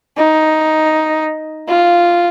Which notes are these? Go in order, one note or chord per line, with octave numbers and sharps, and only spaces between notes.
D#4
F4